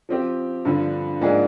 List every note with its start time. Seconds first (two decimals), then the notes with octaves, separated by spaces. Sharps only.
0.09 F3 C4 G4
0.65 G2 D3 F3
1.21 G#2 F3 A#3 D4 G#4